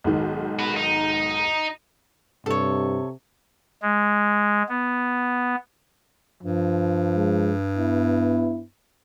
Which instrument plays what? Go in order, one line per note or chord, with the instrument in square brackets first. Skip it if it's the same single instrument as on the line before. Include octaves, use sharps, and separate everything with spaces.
[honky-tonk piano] B1 G#2 D#3
[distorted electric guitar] F#4 B4
D#4
[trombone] G2 [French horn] C3 [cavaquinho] A4 C#5
[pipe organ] G#3
B3
[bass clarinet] G2 [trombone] F3
[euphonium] G#3
[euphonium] B3 [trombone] E4